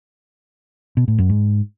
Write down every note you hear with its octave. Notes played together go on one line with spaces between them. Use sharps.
B2
A2
F#2
G#2